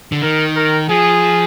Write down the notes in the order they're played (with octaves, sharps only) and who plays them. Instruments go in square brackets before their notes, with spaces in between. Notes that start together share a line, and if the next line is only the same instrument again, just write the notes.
[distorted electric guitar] D3
[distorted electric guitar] D#3 [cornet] A#4
[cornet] A#4
[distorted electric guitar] F3 [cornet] G#4